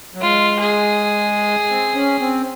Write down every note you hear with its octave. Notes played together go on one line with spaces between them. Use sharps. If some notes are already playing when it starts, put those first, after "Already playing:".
F#3
G#3 F4
G#4
C4
C#4
C4